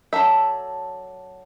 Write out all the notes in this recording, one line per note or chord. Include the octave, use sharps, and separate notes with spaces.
F#3 D4 A4 E5